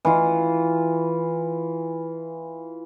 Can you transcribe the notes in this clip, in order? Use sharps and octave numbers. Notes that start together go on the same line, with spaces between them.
E3 F4